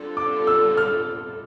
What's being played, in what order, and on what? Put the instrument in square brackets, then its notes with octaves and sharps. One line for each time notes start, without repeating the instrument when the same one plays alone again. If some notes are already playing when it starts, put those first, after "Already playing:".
Already playing: [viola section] D3 G3 C4 F4 A4
[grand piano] D6
E6
F6